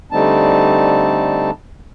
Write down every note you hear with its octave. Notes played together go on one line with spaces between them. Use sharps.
D3 G3 A3 C4 D#4 A5